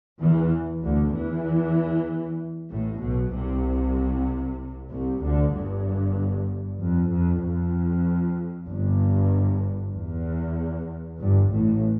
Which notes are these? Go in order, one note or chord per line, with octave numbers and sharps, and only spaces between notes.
E2 E3
D2 D3
E2 E3
A1 A2
B1 B2
C2 C3
C2 C3
D2 D3
G1 G2
F2
F2
F2
G1 G2
E2
G1 G2
A1 A2